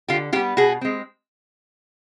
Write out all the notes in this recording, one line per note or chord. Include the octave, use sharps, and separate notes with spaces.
D3 F4 G4
G3 B3 F4 G4
B2 F#4 G#4
G#3 C4